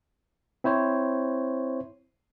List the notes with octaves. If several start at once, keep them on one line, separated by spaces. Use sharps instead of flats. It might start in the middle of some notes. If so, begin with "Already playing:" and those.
C4 E4 C5 C#5